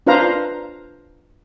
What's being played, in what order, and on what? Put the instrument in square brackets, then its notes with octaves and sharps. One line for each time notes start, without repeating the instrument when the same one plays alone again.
[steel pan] D4 F4 B4 C5 F5 A#5